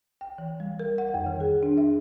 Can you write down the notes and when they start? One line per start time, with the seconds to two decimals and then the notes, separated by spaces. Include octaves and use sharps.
0.21 G5
0.38 E3
0.60 G3
0.80 A#4
0.98 F#5
1.14 F2
1.26 D#3
1.40 G#4
1.63 D4
1.78 E5